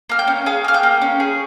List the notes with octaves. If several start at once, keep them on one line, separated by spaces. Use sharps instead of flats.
A#3 F6
G5 G6
C#4
G#4 F5 F6
A#3 F6
G5 G6
A#3
C#4
G#4